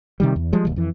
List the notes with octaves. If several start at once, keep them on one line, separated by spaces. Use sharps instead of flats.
C3 D#3 G3
E2
F3 G3 G#3
E1 D#2
F2 E3